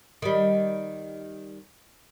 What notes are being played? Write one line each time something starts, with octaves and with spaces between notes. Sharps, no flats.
D#3 G3